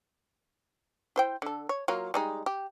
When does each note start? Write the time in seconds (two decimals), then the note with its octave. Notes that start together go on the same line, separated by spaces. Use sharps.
1.16 E4 C5 G5
1.42 D3 A4
1.69 C#5
1.88 F#3 A#3 F4
2.14 G3 G#3 D#4
2.46 G4